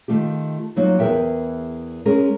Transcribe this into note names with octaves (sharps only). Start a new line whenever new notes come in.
D#3 A3 F4 G4
F#3 A#3 C4 D#4 F4
E2 E3 G#4 A#4 E5 G5
G#3 C#4 G#4 A#4